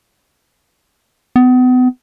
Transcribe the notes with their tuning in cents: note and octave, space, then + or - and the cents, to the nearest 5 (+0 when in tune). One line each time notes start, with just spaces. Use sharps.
B3 +35